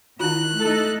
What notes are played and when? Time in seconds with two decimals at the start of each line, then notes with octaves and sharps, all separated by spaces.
0.20 D#3 E4 F4 F#6
0.59 A3 D#4 A4